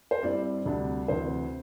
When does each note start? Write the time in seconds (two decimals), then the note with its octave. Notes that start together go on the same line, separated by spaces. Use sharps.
0.11 C5
0.23 G2 G3 C4 E4 D5
0.66 D2 C3 G3 D4
1.08 D2 C3 E3 C5